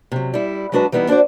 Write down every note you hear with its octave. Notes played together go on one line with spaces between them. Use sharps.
C3 F#3
G3 E4
F#3 G#3 D4 F#4 B4 A5
E3 G3 B3 D#4 E4
D4 F#4 C5 D5